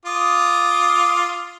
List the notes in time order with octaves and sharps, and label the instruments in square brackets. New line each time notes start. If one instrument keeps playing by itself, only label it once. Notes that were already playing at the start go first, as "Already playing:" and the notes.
[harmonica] F4 D6 D#6